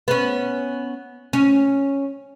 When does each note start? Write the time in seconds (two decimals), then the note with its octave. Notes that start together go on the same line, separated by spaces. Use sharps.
0.08 B3 C#4
1.33 C#4